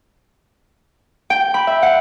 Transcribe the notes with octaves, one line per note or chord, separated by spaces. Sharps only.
G5
B5
E5
F#5